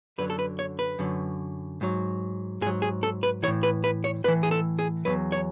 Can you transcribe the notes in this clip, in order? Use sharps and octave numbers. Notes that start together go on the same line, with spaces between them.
F#2 D3 F#3 B4
A4
B4
C#5
B4
F#2 D3 F#3
G#2 F#3
G#2 G#4
F#3
G#4
A4
B4
A2 E3 C#5
B4
B4
C#5
A2 E3 B4
G#4
A4
G#4
E2 B2 F#3 B4
C#5